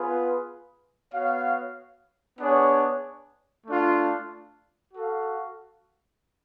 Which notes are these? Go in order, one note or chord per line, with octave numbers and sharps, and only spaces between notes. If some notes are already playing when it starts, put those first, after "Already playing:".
Already playing: B3 F4 G#4 B4
B3 F#4 C#5 F5
B3 D4 G#4 C#5
A3 D4 F4
F#4 A4 F5